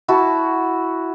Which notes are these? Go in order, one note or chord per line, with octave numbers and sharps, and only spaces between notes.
E4 F#4 A5